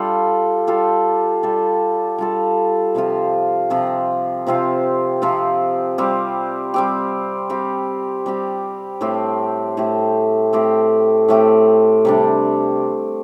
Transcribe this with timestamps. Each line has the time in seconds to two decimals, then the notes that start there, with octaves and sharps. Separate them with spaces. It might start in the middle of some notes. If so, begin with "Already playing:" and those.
Already playing: G3 F4 A4
0.67 G3 F4 A4
1.43 G3 F4 A4
2.18 G3 F4 A4
2.95 C3 F3 C4 F4
3.70 C3 F3 C4 F4
4.47 C3 F3 C4 F4
5.22 C3 F3 C4 F4
5.98 G3 C4 G4
6.74 G3 C4 G4
7.50 G3 C4 G4
8.26 G3 C4 G4
9.01 A2 A3 C4 G4
9.77 A2 A3 C4 G4
10.53 A2 A3 C4 G4
11.28 A2 A3 C4 G4
12.05 C3 G3 D4